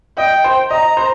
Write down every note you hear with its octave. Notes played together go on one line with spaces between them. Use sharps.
D#5 G5
C5
D#5 A#5
C5